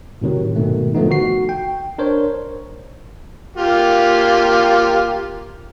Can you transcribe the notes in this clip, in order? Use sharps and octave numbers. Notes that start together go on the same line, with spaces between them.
A2 C3 D#3 F#3
G#2 B2 D#3 A3
D3 D#3 F3 A3 B3 D#4
F#4 C7
G5
D4 A#4 C5 C#5
A#3 F4 G4